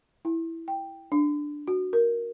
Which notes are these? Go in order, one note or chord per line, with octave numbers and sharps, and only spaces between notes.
E4
G5
D4
F#4
A#4